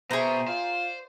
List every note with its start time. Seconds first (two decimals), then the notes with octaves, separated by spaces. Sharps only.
0.11 B2 G#4 C5 E5 G5 A#5
0.48 F4 C5 D5